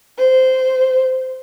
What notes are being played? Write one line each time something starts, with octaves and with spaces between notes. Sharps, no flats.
C5